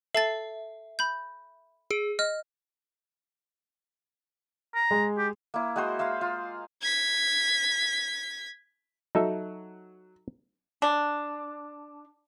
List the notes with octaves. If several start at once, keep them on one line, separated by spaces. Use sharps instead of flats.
A4 E5 A5 A6
B5 G6
G#4 D7
D#5 F6
A#5
G#3
G4
A#3 E4
G#3 F#4 C5
E5 F5 A#5 C6
F4
G#6 B6
F#3 D#4 A4 E5
D4